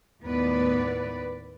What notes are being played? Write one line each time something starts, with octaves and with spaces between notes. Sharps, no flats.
D#2 A2 B3 B4 D5